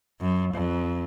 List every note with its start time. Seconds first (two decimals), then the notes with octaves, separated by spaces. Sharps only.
0.21 F#2
0.54 F2